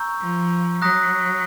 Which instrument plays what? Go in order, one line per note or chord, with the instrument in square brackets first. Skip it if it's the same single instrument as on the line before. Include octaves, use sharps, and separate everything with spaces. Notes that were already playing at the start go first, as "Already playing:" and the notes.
Already playing: [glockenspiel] A#5 C#6 E6 G6
[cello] F3
[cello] F#3 [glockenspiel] A#5 D#6 F#6 A#6